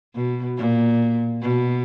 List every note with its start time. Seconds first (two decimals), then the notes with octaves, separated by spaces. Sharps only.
0.15 B2
0.57 A#2
1.42 B2